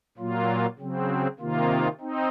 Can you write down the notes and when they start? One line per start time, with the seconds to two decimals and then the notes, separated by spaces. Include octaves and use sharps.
0.18 A#2 F#3 A#3 F4
0.78 C#3 F#3 C4
1.39 C3 D#3 A#3 F4
2.01 C4 D#4